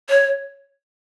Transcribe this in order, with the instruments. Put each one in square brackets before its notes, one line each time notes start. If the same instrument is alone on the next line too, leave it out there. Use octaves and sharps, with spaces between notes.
[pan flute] C#5